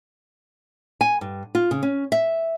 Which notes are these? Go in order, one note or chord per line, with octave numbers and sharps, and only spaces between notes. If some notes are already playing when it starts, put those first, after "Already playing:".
G#5
G2
F4
C#3
C#4
E5